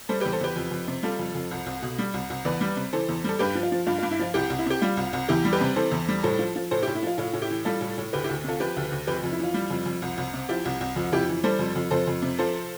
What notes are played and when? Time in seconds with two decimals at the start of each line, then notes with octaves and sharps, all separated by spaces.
0.09 G3 A4 C5
0.20 G4 B4
0.25 E2
0.32 A4 C5
0.41 E2 G4 B4
0.56 F2
0.71 F2
0.88 C3
1.03 G3 F4 A4
1.19 F2
1.35 F2
1.51 C2
1.66 C2
1.82 B2
1.99 G3
2.14 C2
2.30 C2
2.45 E2 B4 D5
2.61 G3
2.77 C3
2.93 E3 A4 C5
3.09 E2
3.24 G3 A4
3.39 G2 G4 B4
3.55 F3
3.63 F4
3.72 F3
3.87 G2 F4
3.98 F4
4.03 G2
4.11 E4
4.19 F3 F4
4.34 C2 E4 G4
4.50 C2
4.59 E4
4.66 C3 G4
4.82 G3 F4
4.97 C2
5.13 C2
5.28 E2 E4 G4
5.45 G3
5.53 G4 B4
5.61 C3
5.76 E3 A4 C5
5.92 E2
6.08 G3
6.23 A2 A4 C5
6.39 F3
6.56 F3
6.71 A2 A4 C5
6.83 E4 G4
6.87 A2
6.95 E4
7.03 F3 F4
7.18 A2 F4
7.33 A2
7.42 E4 G4
7.50 E3
7.65 G3 F4 A4
7.81 A2
7.98 A2
8.13 D2 G4 B4
8.24 E4 G4
8.29 D2
8.44 C3 F4 A4
8.60 F3 G4 B4
8.76 D2
8.92 D2
9.07 F2 G4 B4
9.23 F2
9.32 E4
9.39 E3 F4
9.54 G3
9.70 F2
9.86 F2
10.02 C2
10.18 C2
10.33 C3
10.49 F3 E4 G4
10.65 C2
10.81 C2
10.96 F2
11.12 F2 E4 G4
11.29 E3
11.44 G3 A4 C5
11.59 F2
11.75 F2
11.91 F2 A4 C5
12.07 F2
12.22 C3
12.39 F3 A4 C5